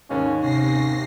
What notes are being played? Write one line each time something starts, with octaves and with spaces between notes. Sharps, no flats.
D#2 G#2 D#3 C#4
C3 C#4 A#6 C7